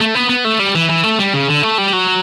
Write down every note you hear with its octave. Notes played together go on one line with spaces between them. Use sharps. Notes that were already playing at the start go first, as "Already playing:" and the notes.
A3
B3
B3
A3
G3
E3
E3
A3
G3
C#3
D3
A3
G3
F#3